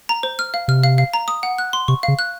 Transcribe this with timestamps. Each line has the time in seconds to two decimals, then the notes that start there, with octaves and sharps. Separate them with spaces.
0.09 A#5
0.23 C5
0.39 F6
0.54 F5
0.68 C3 F6
0.84 F5
0.98 F5
1.13 A#5
1.28 D#6
1.43 F#5
1.58 F#6
1.73 C6
1.88 C3 C#6
2.03 F5
2.08 C#3
2.19 F#6